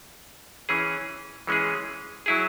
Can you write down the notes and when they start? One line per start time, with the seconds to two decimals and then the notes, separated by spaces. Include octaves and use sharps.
0.69 E3 C#4 G#4
1.47 E3 G#3 C#4 G#4
2.26 F#3 E4 G#4